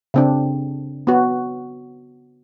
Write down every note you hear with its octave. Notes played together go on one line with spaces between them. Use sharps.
C#3 C4 D4
B3 F#4